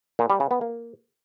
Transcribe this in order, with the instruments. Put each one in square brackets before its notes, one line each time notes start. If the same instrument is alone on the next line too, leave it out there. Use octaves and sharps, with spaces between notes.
[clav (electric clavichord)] A#2
G3
C#3
B3
A#3